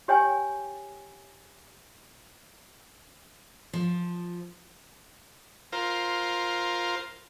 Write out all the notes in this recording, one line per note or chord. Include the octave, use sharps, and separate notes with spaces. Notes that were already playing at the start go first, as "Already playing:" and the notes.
G4 C#5 G5 G#5
F3
F4 A#4 C5